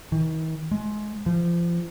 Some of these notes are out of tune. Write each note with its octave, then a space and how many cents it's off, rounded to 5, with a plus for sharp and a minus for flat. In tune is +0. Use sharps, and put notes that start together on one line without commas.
D#3 +40
G#3 +20
F3 -30